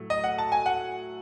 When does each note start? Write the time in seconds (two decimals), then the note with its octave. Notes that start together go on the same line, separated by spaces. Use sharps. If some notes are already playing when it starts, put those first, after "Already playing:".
Already playing: A2 F#3 A3
0.10 D#5
0.24 F#5
0.38 A5
0.52 G#5
0.66 F#5